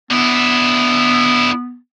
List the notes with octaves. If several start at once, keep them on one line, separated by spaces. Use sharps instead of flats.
D3 B3 E4